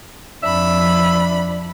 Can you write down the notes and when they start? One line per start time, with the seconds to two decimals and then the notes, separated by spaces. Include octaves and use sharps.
0.43 F2 D4 E5 B5